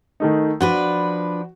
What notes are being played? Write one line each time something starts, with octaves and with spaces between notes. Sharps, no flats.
D#3 A3 D#4
F3 D4 F#4 B4